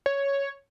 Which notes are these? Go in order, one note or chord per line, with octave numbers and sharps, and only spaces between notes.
C#5